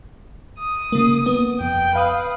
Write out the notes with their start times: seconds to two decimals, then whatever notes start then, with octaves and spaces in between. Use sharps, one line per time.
0.59 D#6
0.92 C#3 A#3
1.26 B3
1.60 F2 G5
1.96 B4 F5 D#6